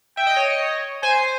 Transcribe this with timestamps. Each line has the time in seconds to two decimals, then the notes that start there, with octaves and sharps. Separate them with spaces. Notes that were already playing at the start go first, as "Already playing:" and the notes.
0.17 E5 G5
0.27 D#5
0.36 C#5
1.03 C5 G#5